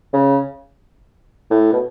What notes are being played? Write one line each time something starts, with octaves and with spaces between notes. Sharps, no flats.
C#3
A2
B2